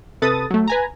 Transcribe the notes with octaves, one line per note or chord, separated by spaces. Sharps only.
C3 A4 B4 D#6 A6
F#3 A3
B4 G#5 A#5